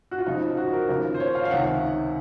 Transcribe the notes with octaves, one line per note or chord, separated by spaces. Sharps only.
F#4
F4
F2 C#3 F3 D#4
D#4
F#4
A#4
D#2 C#3 F3 A#4
C5
C#5
F5
F5
C#2 C3 D#3 F#5